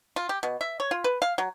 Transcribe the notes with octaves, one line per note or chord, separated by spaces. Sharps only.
F4
G4
B2
E5
C#5
F4
B4
F5
F#3